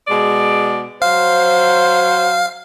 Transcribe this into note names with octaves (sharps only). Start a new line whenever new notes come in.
B2 G#3 D5
F#3 C5 F5